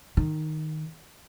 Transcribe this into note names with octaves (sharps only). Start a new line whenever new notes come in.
D#3